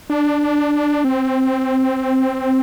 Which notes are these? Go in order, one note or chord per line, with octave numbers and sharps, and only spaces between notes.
D4
C4